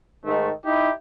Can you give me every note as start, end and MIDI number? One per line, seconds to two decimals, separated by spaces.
0.25 0.50 44
0.25 0.50 51
0.25 0.50 57
0.65 0.90 63
0.65 0.90 64
0.65 0.90 67